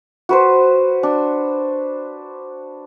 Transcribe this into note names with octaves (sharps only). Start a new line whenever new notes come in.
F#4 B4 C5
D4